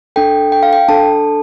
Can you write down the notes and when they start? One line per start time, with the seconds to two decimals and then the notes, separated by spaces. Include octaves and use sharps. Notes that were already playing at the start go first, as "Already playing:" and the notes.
0.16 D4 A4 G5
0.52 G5
0.63 F5
0.73 G5
0.89 D4 A4 A5